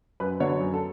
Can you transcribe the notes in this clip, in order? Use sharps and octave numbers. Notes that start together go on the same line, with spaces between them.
F#2 B4
D3 F#3 B3 C#5
F#2
A4